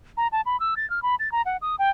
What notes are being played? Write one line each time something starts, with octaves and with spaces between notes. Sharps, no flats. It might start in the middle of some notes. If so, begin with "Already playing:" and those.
A#5
A5
B5
E6
A6
F6
B5
A6
A#5
F#5
D#6
G5